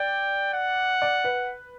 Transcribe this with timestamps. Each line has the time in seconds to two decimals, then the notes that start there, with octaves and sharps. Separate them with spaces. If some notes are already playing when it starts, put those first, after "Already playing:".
Already playing: D5 G5
0.54 F#5
1.02 D5
1.25 B4